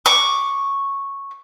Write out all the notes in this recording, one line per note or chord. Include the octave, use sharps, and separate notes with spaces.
C#6 D6